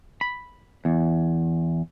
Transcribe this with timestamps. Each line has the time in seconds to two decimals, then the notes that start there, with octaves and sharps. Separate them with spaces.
0.21 B5
0.85 E2